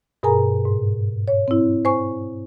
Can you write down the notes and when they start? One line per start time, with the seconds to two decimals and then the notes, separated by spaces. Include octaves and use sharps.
0.23 G2 B2 G#4 A#4 G#5 A#5
0.65 G#2
1.28 C#5
1.48 C4 E4
1.85 C5 G#5 C#6